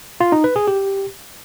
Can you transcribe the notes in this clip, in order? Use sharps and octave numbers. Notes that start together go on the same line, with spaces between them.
F4
D#4
B4
G#4
G4